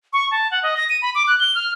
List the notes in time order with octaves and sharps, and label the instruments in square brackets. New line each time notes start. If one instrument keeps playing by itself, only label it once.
[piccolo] C#6
A5
F#5
D#5
A#6
D#7
B5
D6
F#6
G7
F6